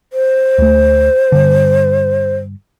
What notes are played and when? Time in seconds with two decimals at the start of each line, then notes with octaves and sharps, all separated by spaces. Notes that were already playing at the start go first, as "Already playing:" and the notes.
0.13 C5
0.58 D2 A3
1.32 G2 D3